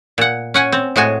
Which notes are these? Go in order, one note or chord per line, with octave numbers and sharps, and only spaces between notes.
A#2 F#5
C#4 F#5 G#5
C4
A2 G#3 F#4 G#5